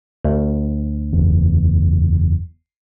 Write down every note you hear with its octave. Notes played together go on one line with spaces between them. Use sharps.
D2
F#1 E2